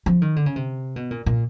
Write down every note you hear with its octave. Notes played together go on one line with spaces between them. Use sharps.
F3
D#3
D3
C#3
C3
B2
A#2
A#2